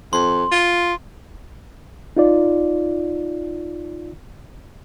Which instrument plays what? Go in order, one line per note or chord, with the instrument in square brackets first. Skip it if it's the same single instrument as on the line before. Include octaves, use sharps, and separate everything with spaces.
[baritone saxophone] F2 [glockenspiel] C6
[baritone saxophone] F4
[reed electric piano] D#4 F4 D5